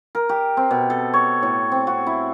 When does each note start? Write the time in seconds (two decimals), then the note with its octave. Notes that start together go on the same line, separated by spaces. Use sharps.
0.15 A#4
0.29 G4
0.57 C4
0.71 B2
0.90 A4
1.14 C#5
1.43 A2
1.72 C4
1.87 F#4
2.07 E4